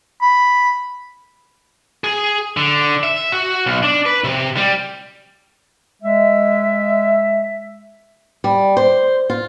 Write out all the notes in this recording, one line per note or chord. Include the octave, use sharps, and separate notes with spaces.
B5
G#4
D3
E5
F#4
B1
D4
B4
C3
G3
G#3 E5
G3
C5
F4